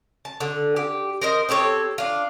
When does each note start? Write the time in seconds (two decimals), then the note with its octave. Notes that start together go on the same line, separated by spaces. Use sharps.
0.25 A5
0.40 D3
0.76 G4
1.21 A#4 C5 D#5
1.49 C4 G4 A4 C#5
1.98 D4 F4